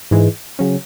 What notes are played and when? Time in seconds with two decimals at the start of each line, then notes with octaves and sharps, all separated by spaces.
0.11 G#2 E3 G#3
0.59 C#3 F#3 C#4